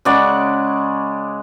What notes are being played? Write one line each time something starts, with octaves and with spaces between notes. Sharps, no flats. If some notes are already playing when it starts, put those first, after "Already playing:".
C#3 G#3 D5 F#5